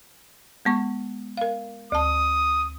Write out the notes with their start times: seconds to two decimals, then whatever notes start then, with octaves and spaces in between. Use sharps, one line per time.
0.65 G#3 B3 C#6
1.37 A#4 F5
1.92 D2 A5 D#6